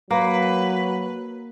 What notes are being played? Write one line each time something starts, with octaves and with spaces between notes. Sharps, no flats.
F#3 A#3 B4